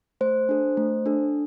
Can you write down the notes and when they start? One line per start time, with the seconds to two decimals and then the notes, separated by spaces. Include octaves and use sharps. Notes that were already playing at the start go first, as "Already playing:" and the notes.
0.21 A3 C5
0.49 D4 A4
0.77 A3
1.06 D4 A4